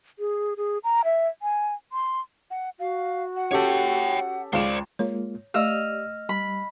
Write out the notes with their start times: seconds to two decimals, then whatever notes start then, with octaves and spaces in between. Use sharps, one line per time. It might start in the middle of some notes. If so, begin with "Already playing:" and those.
0.19 G#4
0.57 G#4
0.84 A#5
1.04 E5
1.42 G#5
1.92 C6
2.51 F#5
2.80 F#4 F5
3.36 F#5
3.51 C#4 G4 A4 C#5 G5
4.53 C#2 F4 C5 D5 E7
4.99 G#3 A#3 F4 C#5
5.54 A3 G4 D5 D#5 F5 E6 F6
6.29 G3 B5